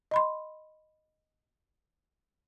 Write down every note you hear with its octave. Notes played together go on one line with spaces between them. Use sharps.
D#5 B5 C6